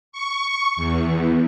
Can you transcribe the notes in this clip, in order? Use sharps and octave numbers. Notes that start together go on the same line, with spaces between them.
C#6
E2